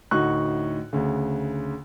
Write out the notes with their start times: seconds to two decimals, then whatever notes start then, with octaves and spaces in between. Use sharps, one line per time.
0.11 D2 A2 D#4 F#4 C#6 F#6
0.93 D2 C#3